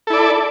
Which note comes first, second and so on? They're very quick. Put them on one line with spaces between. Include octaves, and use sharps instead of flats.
A4 E4 D5